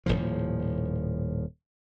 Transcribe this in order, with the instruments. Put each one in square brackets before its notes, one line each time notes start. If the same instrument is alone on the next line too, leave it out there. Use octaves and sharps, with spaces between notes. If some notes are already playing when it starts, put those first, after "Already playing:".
[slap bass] D#1 G#1 A2 F3